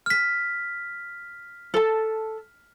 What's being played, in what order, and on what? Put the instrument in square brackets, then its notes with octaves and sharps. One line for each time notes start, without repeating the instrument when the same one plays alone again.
[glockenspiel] F6 B6
[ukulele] A4 A5